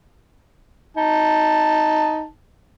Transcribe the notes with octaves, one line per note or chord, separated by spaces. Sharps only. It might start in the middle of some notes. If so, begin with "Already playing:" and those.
D#4 A5